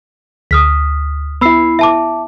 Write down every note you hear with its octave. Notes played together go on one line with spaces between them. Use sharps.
D2 D#6 F6 B6
B3 E4 B5 E6 C7
E5 A5 D6